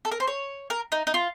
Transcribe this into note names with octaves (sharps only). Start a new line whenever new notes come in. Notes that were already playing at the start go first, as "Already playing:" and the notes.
A4
A#4
C5
C#5
A#4
D#4
D#4
F4